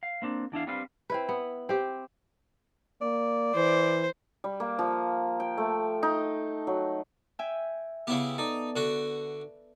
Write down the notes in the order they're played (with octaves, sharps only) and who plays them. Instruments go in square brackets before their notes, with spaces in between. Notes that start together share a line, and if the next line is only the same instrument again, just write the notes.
[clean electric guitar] F5
A#3 C4 D4
E2 D4 E4 F5
G3 C4 D4 B4 F5
[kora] C4 E4 B4
B3
C4 G4
[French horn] A#3 [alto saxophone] D5
[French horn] E3 [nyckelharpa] C5
[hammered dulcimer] G3
A#3
F3
G5
A3
D#4
F#3
[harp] E5 G5 G#5
[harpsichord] C#3 E4 G4 [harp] B3
[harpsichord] D#4 [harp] A4 D5
[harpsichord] D3 F#4